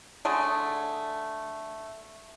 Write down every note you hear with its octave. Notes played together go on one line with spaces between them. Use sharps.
D3 A3 G#4